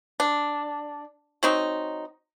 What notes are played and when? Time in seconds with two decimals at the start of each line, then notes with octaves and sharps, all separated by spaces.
0.20 D4
1.43 F#3 C4 D#4